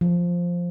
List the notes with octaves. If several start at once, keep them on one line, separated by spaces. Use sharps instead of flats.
F3